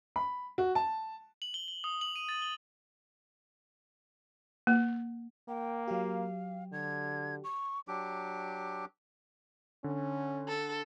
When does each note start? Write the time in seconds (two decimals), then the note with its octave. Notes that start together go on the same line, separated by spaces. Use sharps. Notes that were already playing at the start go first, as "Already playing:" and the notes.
0.16 B5
0.58 F#4
0.75 A5
1.42 F#7
1.54 G7
1.68 G7
1.84 D#6
2.01 F#7
2.16 D#7
2.29 A6
2.42 G7
4.67 A#3
5.48 A#3 G5
5.88 F#3 G4 F5
6.72 D3 G#6
7.44 C#6
7.88 F#3 D4 G4 D6
9.84 D3 C#4
10.48 A4